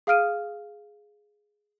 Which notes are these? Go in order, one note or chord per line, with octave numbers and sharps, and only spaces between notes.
G#4 F5 D#6 F6 D7 D#7